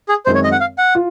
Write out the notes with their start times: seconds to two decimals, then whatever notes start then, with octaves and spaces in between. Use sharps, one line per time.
0.09 G#4
0.26 F#2 D#3 G#3 C4 C5
0.35 C#5
0.44 D#5
0.52 F#5
0.60 F5
0.78 F#5
0.95 F4